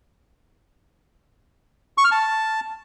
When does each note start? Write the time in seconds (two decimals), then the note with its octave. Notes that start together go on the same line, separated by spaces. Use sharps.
1.98 C#6
2.05 F6
2.12 A5